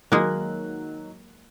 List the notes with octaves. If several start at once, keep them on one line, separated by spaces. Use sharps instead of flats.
D#3 F#3 G#3 A#3 F#6